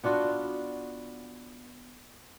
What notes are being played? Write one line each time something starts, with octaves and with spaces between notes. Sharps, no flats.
B3 D4 F4 F#4